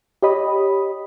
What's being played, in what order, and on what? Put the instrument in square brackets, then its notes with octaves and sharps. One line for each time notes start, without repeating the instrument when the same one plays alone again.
[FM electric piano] G4 C#5 D#5 B5 D#6